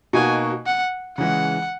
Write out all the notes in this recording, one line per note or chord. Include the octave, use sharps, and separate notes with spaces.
B2 A#3 D#4 F#4 G#5
F#5
C#3 E3 G#3 F#5